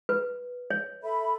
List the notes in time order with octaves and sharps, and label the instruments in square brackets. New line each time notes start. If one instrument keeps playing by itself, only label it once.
[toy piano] B4
C#5
[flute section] A4 E5 B5